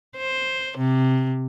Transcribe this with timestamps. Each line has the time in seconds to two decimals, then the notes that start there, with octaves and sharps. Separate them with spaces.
0.17 C5
0.78 C3